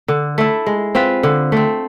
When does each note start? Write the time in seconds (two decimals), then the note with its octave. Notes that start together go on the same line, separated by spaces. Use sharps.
0.08 D3
0.38 A3 E4
0.67 G#3
0.95 C4 F4 B4
1.23 D3
1.52 A3 C4